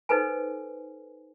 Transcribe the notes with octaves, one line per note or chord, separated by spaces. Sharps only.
D#4 A4 B4 C5 G#5